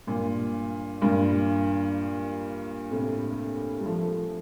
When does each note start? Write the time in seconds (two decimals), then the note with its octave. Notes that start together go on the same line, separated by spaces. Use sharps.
0.07 G2 A#2
1.01 G2 A#2
2.91 A2 C3
3.80 G3
3.85 F3 A3